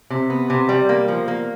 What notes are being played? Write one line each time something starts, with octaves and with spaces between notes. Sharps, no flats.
C3
B3
C3
G3
A#3
F3
A#3